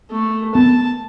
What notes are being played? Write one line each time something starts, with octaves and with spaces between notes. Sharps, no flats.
A3
B3 A5